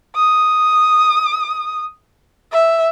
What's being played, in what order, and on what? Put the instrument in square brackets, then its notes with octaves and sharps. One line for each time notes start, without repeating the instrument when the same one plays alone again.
[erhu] D#6
E5